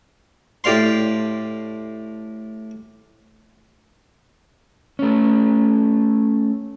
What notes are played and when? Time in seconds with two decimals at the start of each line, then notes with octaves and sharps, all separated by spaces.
0.64 A2 G4 D5 F5 C6
4.99 A3 C#4